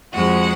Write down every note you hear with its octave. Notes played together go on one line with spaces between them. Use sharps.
F2 F3 G#3 F#4 F#5